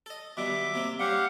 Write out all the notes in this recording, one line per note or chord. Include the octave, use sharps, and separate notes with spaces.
A4 D#5
B2 D#3 G3 E5 D6
C3 A#3 C4
G3 C#4 G4 F5 F#5